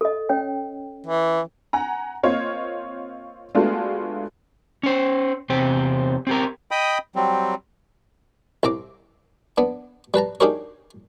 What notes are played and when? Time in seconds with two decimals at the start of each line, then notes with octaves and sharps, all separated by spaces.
0.01 A4 D#5
0.29 C#4 C#5 G5
1.07 E3
1.73 F#5 G#5 A#5
2.23 A#3 C4 F4 C#5 D#5 F5
3.55 G#3 A3 B3 D4 F4 F#4
4.83 C#4 C5
5.50 E2 C3 C4 G4 C5
6.27 C4 G4 A#4
6.71 D#5 G5 B5 D#6
7.15 F#3 G3 C4
8.63 C2 C4 A#5 D6
9.58 B3 D4
10.14 G3 B4 A5 A#5
10.40 D4 D#4 G4 G#4 A#4 C#5